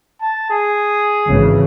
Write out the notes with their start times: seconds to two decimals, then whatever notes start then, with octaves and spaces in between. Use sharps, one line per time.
0.21 A5
0.51 G#4
1.25 G#1 C#3 E3